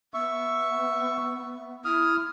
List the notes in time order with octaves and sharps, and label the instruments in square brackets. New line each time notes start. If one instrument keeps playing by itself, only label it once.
[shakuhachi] B3 [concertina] E5 C#6
[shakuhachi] E4 [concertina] D#6 F6